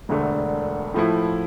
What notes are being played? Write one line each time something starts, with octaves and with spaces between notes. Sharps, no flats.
E1 D2 D3 A3 D4
A2 F3 A3 E4